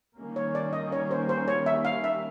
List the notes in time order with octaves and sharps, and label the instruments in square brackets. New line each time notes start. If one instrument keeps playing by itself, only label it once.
[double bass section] D#3 G3 A#3 C#4
[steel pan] C#5
D5
D#5
C#5
C5
C5
C#5
E5
F5
E5